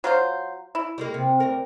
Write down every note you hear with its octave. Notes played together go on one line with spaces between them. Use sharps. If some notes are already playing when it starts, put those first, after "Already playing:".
F#3 F4 C5
E4
G3 G#3 A#3
C3
D2 A#4